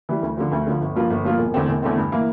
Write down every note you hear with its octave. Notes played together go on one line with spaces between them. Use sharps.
E3 G3
D2
D3 F3
D2
D3 F3
G1
G2 F3 A#3 F4
G1
G2 F3 A#3 F4
E1
E2 D3 A3 C4
E1
E2 D3 A3 C4
G2
E3 A#3